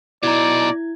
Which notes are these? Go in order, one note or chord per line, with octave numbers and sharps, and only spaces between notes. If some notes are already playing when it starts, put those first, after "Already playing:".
B2 D#4 E4 D5 G#6